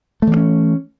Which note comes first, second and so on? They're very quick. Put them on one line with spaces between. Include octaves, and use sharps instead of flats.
A3 E3 A#3 C#4